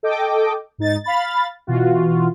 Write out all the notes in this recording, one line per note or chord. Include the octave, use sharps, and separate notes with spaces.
A4 D#5 G5 D6
G#2 D#4 A6
F5 B5 A6
B2 E3 F4 F#4